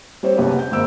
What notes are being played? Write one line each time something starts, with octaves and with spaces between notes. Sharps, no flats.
G3 C4 C5 C#5
F#1 C2 B3 G4 B4 C#5
G6
G#1 G#2 A#3 C5 E6 D7